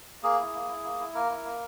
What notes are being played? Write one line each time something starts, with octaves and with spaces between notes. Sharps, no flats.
A#3 G#4
E4
A#3
E4
A#3
E4
A#3 A#4
E4
A#3